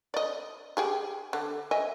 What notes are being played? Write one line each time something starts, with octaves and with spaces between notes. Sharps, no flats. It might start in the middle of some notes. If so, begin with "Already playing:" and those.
D5 D#5
G4 G#4 G5
D3
D#5 E5 G#5